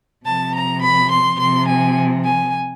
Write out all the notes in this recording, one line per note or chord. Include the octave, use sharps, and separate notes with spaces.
C3 F3 A5
A#5
B5
C6
C3 F3 C6
G#5
G#5